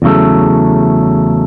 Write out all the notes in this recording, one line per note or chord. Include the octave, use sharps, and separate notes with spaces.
E2 C#3 F#3 A3